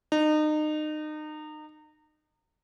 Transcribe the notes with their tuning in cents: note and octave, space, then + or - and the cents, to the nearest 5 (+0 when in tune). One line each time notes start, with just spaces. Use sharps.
D#4 -30